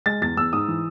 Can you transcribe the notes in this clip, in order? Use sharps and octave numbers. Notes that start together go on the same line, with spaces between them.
G#3 A6
E2 A6
E2 E6
G#2 D#6
E3